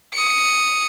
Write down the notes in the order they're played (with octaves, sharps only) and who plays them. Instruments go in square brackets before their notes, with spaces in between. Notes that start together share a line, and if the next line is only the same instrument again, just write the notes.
[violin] D#6 C#7